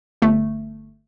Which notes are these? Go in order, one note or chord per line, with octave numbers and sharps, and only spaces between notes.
G1 A3